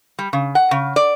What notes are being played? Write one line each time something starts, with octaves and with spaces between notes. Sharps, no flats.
G3
C#3
F#5
C#3
D5